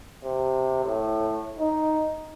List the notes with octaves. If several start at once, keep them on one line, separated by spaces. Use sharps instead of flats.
C3
A2
D#4